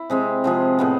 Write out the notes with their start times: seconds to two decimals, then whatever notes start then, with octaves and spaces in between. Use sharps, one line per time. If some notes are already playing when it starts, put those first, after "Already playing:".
Already playing: E4
0.10 C3 G#3 C4
0.44 C3 F3 G#3
0.79 A2 G#3 B3